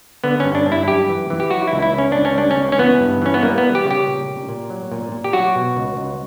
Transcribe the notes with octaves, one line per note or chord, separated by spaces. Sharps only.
D3 B3
G2 C#4
D4
G2
E4
F#2 G4
E3
E3
G4
F#3 F#4
E4
C#2
E4
C#3 C#4
C#2 D4
C#4
G3 D4
C#4
C#2
C#4
E3 B3
G2
E3 C#4
B3
G3 A#3
B3
G3
G4
C#3
G4
A#2
A#2
A#2
F#3
A#2
A#2
G4
F#3 F#4
B2
C#2
C#2